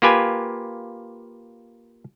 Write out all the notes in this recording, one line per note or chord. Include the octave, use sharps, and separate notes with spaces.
A#3 F4 G4 B4 G#5